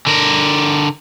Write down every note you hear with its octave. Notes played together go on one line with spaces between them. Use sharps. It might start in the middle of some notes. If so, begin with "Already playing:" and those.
D3 A#4